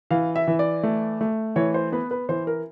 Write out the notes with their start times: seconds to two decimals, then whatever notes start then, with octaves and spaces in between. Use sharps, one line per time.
0.11 E3 F5
0.36 E5
0.47 E3
0.59 D5
0.83 A3
1.21 A3
1.56 E3 C#5
1.74 C5
1.92 B3 B4
2.11 B4
2.29 E3 C5
2.47 A#4